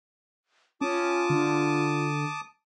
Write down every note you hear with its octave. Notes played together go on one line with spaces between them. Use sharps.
C#4 F4 A5 D6 D#6
D3